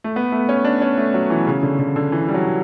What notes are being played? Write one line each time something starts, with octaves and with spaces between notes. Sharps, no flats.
A3
B3
A3
C#4
D4
C#4
A3
F#3
E3
C#3
D3
D3
D3
E3
G3
F#3